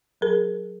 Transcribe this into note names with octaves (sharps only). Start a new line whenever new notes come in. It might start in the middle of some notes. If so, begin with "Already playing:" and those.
F#3 G#4 A#4